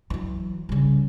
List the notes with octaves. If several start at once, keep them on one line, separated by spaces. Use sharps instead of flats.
E3 F#3
C#3 G3